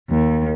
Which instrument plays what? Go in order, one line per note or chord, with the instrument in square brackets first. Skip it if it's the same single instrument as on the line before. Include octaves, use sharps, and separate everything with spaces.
[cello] D#2